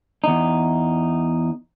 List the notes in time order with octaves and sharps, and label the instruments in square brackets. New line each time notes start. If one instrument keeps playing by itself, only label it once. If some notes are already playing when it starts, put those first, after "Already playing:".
[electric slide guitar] E2 D#4